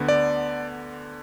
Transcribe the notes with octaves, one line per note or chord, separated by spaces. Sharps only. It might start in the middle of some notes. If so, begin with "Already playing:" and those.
Already playing: D2 D3 B3
D5